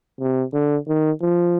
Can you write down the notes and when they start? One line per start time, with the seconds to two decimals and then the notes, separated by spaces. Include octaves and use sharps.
0.20 C3
0.53 D3
0.87 D#3
1.21 F3